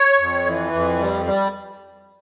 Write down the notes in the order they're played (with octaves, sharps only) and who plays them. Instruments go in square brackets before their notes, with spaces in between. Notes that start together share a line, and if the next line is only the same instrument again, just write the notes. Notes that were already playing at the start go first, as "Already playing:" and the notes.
Already playing: [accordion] C#5
F2
E3
F2
G3
G3